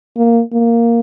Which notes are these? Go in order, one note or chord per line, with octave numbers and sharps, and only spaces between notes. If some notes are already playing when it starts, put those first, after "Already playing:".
A#3
A#3